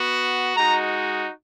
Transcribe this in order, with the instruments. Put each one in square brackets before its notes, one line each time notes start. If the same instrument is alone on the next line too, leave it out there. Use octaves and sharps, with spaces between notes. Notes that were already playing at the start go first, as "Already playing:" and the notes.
Already playing: [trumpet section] B3 F#4
G#3 D#4 F#4 A#5